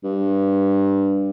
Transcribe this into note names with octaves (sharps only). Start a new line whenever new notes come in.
G2